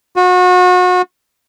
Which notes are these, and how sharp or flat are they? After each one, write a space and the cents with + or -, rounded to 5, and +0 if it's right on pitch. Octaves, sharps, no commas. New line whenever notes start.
F#4 -35